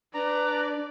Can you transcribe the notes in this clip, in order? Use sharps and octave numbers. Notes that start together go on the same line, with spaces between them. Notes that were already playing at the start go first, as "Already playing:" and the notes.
D4 B4 D5 A#5